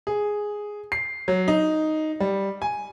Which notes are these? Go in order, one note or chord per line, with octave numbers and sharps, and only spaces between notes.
G#4
C7
F#3
D#4
G3
G#5